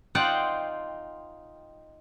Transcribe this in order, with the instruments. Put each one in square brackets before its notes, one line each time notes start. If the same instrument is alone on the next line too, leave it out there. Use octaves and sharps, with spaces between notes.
[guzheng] D#4 F4 C5 D5 F#5 G5